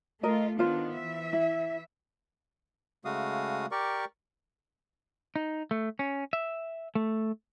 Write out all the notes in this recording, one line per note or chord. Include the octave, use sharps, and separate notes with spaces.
A3 F4 A#4 D#5
D#3 B3 D4 F4 C5
E3 E5
E4
C#3 G#3 A3 F#4 F5 D#6
G4 A#4 D5 C#6
D#4
A3
C#4
E5
A3